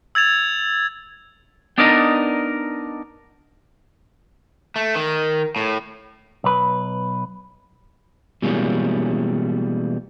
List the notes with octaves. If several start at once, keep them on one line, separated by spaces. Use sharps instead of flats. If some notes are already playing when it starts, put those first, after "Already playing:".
E6 G#6 A6 F7
B3 D4 D#4 A#4 D5 D#5
A3
D#3
A2
B1 B4
B2 E3 G3 G#3 A#3 C#4